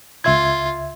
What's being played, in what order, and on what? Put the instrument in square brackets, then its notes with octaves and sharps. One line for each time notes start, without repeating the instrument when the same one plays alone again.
[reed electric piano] C#2 E5 G#6 [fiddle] F4